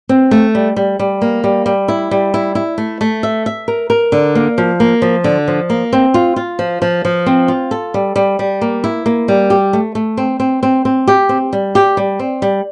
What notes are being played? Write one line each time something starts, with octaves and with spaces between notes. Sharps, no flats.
C4
A3
G3
G3
G3
A#3
G3
G3
E4
G3
E4
E4
A3
A3
E5
E5
A#4
A#4
D3
A#3
F3
A#3
F3
D3
F3
A#3
C4
F4
F4
F3
F3
F3
C4
F4
A4
G3
G3
G3
A#3
E4
A#3
G3
G4
A3
A3
C4
C4
C4
C4
G4
C4
G3
G4
G3
C4
G3